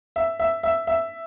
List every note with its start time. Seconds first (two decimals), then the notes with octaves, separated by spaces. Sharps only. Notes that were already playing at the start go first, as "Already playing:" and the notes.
0.16 E5
0.40 E5
0.63 E5
0.87 E5